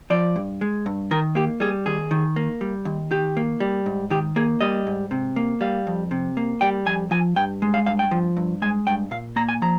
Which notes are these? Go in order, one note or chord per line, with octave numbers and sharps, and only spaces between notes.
F3 D5
G2
G#3
G2
D#3 A#4
A#3 G4
G3 G#4
D#2 G#4
D#3
A#3
G3
D#2
D#3 G4
A#3
G3
G#2
D#3 G4
A#3 G#4
G3 D#5
G#2
C3
A#3
G3 F5
F2
C3
A#3
G3 G5
F2 G#5
F3 G#5
G2 G5
G#3
F5
G2 F5
G5
F3
G2
G#3 G#5
G2 G5
A#2 F5
A#3 A#5
G#5
F3 A#5